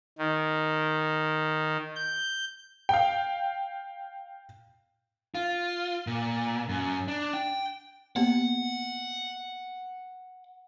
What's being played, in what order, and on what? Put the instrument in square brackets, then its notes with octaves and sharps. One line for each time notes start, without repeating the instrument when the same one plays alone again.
[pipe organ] D#3
G6
[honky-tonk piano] F5 G5
[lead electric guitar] F4
A#2
F#2
D4
G5
[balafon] A#3 B3 G4 [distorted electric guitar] F#5